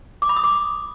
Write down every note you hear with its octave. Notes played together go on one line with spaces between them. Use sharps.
D6
B5
D#6
D6